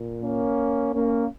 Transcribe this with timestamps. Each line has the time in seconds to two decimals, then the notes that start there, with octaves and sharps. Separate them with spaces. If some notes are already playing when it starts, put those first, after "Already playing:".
Already playing: A#2
0.20 A#3 C#4
0.93 A#3 C#4